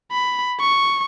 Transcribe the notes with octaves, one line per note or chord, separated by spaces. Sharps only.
B5
C#6